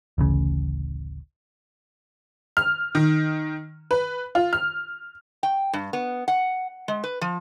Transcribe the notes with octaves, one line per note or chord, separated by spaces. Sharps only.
D1 A1 C#3
F6
D#3
B4
F4
F6
G5
G2
B3
F#5
G#3
B4
F3